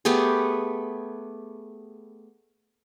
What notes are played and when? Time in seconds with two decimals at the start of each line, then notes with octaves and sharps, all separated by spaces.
0.05 A3 B3 G4 G#4